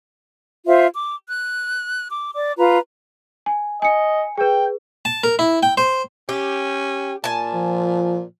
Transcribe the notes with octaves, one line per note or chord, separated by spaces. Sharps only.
F4 C5 E5
D6
F#6
D6
D5 D6
F4 B4 A#5
G#5
D#5 G#5 C#7
G#4 B4 G5
A5
A#4
E4
G5
C5
C#4 G4
A#2 G#5 A5
F3